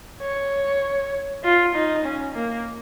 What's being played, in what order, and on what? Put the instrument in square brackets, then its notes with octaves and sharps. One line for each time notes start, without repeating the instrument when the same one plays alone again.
[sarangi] C#5
F4
D#4
C#4
A#3